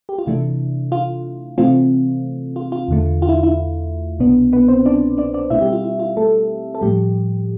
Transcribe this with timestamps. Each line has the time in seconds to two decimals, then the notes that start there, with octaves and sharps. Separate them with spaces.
0.09 G4
0.18 F4
0.26 C3 E3 A3 D4 E4
0.92 F4
1.58 C3 E3 A3 C4 F4
2.56 F4
2.72 F4
2.88 E2 D3 A3
3.22 F4
3.29 E4
3.43 E4
4.19 C2 B2 B3 D4
4.53 B3 B4
4.68 C4 C5
4.85 D4 D5
5.18 D4 D5
5.34 D4 D5
5.50 B2 A3 C4 E4 E5
5.61 G3 G4
5.72 F4
5.84 E4
5.99 F4
6.17 A3 A4
6.75 A4
6.81 A2 F3 G3 A3 G4